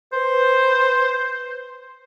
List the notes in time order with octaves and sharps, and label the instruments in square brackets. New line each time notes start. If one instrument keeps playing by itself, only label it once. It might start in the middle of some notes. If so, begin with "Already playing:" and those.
[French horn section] B4 [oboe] C5